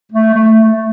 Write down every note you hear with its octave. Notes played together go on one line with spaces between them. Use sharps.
A3
A3